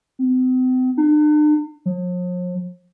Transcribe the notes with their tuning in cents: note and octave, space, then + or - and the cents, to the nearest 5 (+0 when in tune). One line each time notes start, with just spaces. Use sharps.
C4 -40
D4 +45
F3 +45